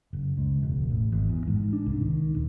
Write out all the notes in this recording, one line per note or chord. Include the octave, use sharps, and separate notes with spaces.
F#1
C#2
E1
A1
G#1
E2
G#2
D4
C2
D#3
D#1